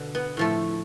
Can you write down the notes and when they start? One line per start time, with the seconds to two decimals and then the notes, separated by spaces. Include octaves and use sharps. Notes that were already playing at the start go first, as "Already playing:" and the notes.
Already playing: B2 D3
0.15 B3
0.37 A2 F3 A3